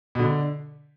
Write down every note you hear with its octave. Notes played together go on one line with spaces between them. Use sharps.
B2
D3